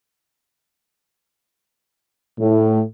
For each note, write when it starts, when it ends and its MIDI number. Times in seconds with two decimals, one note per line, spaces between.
2.40 2.82 45